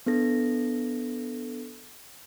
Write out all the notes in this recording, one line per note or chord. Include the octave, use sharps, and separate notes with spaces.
B3 D4 A4 A#6